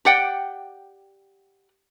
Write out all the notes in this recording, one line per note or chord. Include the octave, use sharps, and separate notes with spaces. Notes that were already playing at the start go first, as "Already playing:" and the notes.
G4 D5 F#5 G5